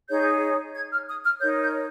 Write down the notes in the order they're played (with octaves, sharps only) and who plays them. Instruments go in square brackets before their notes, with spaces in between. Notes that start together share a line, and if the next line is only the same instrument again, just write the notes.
[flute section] D#4 G#4 C#5 G6
G#6
F6
D#6
F6
D#4 A#4 C#5 G6
G6